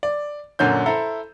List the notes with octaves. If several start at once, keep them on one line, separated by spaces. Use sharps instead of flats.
D5
F#2 A#2 D3 C#4 G6
E4 A4 C5 A#5